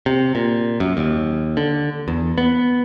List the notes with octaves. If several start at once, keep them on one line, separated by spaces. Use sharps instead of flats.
C3
A#2
F#2
D#2
D3
E2
B3